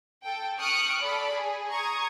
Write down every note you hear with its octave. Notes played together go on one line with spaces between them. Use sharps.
A4 G5
C#6 D#6 F6 F#6 C#7 D7
A4 D5 B5
G#4
A#5 C#6 D#6 G#6